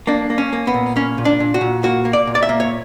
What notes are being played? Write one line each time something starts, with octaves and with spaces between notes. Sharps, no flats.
A#3 D4
A#3
C#4
A#3
B3
A#2
A#3 C#4
A#2
D4
A#2
F#4
A#2
A#3 F#4
A#3
D5
A#2
D5
E5
A#3
C#5